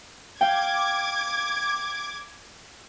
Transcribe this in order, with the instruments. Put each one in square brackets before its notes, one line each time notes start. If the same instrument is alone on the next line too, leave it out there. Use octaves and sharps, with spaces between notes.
[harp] F5 G5 [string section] D6 G#6